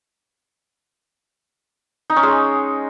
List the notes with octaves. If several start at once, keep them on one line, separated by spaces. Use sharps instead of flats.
D#4
C#4
G#3